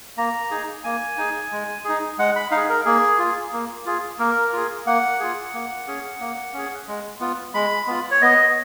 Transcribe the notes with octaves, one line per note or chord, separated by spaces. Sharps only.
A#3 A#5
D#4 G#4
A#3 G#5
D#4 G#4
G#3
D#4 G#4
G#3 F#5
B5
D#4 F5
G#4
A#4
A#3 G#4
F4 G#4
A#3
F4 G#4
A#3 A#4
F4 G#4
A#3 F#5
F4 G#4
A#3
C#4 G#4
A#3
C#4 G#4
G#3
B3 F4
G#3 B5
B3 F4
C#5
B3 D#5